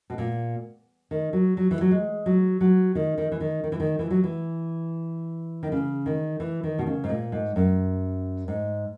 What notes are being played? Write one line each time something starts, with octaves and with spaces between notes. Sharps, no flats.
B2
A#2
D#3
F#3
F#3
E3
F#3
G#3
F#3
F#3
D#3
D#3
E3
D#3
D#3
E3
D#3
E3
F#3
E3
D#3
C#3
D#3
E3
D#3
B2
C#3
G#2
A#2
G#2
F#2
G#2